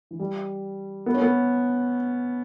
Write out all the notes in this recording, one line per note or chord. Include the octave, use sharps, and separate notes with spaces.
E3
G3
B3
C#4
B3